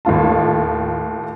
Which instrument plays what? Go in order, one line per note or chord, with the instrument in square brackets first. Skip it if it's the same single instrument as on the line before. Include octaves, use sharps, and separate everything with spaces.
[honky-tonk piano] D#2 A2 F4 A5